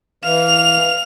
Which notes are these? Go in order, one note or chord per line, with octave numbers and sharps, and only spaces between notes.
E3 F5 F7